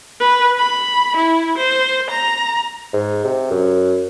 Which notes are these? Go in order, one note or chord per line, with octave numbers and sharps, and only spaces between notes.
B4
B5
E4
C5
A#5
G#2
C3
F#2